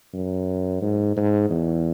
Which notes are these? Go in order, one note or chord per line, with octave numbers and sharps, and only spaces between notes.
F#2
G#2
G#2
E2